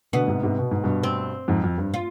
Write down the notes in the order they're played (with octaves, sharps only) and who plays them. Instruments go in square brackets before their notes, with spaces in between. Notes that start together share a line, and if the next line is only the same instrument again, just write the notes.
[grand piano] B2 D3 [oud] B3
[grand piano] G#2 C3
G#2 C3
B2
G#2
G2 B2
[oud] C4
[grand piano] F2 G#2
F2
G2
[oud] F4